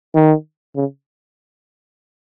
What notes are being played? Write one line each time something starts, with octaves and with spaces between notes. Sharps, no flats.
D#3
C#3